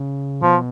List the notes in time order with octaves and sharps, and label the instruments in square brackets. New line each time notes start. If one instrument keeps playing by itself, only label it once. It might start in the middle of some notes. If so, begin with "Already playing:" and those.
Already playing: [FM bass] C#3
[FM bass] B2 [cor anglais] F3